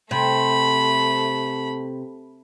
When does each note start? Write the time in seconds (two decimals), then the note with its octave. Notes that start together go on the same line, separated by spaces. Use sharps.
0.11 C3 A3 B5